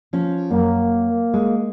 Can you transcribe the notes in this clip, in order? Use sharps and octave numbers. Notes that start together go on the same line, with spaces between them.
F3 C#4
F#2 A#3
G#3